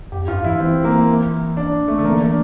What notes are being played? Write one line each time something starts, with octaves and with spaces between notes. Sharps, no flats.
F2 G4
G2 F4
E3 E4
E3 C4
A#3
D4
A3
D3 A3
E3 A#3
D4